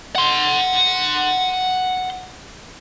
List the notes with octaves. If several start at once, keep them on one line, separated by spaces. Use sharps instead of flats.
F#5 C6